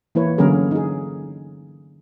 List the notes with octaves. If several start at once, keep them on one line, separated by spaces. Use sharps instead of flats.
E3 A#3 E4 B4 C#5
D3 F#3 A#3 C#4 G#4 A#4
D#4 G#4